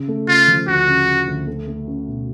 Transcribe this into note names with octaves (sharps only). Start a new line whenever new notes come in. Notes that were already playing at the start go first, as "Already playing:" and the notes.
Already playing: C#3
A3
C#3 F4
F3
D2 F#4
C#3
C#3
D2
A3
A3
C#4
B2